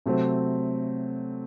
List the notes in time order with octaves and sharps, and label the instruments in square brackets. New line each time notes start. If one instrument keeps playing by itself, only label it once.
[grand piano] C3 F#3 A3 C4